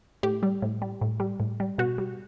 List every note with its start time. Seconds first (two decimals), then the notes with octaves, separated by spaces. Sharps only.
0.23 A2 G4
0.43 G3
0.62 A2
0.82 G3
1.01 A2
1.20 G3
1.40 A2
1.60 G3
1.78 B2 F#4
1.98 G3